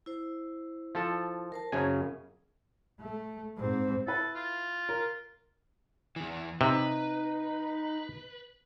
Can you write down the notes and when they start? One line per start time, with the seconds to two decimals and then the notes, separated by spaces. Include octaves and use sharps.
0.06 E4 C5
0.95 F3 A4
1.52 A#4 C5 A5
1.72 F#2 C#3 G#4 G#5
3.00 A3
3.56 G#2 C4
4.07 E4 A4 B4
4.35 F4
4.89 A#4
6.16 E2 E3
6.61 C3 D#4 B4